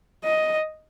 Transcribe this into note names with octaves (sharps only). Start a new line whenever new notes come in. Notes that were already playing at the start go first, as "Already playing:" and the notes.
D#5